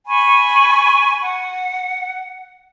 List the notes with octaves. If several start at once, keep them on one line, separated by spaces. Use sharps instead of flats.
G#5 B5 C#6
F#5